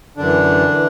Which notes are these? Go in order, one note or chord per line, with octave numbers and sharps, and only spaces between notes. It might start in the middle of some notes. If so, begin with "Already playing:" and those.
F#2 D3 E3 D4
E3